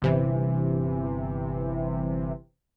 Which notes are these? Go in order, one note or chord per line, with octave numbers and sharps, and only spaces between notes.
G1 C3 E3